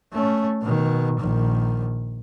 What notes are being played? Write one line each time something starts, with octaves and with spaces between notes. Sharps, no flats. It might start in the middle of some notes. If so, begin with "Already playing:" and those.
A3 C#4
B2 D#3
A#1 D#3